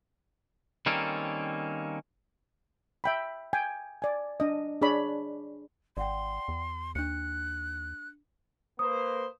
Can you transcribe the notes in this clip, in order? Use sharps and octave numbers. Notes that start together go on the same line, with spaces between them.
D#3 G3 A#3 C4 C#4 A4
E5 G5 B5
G5 G#5
D5 G#5
D4 D#5
D4 G#4 C#5 D5 B5
G#1 D5 F#5 G5 C6
E2
D#2 D4 F#6 C#7
A#3 B4 C5 D#6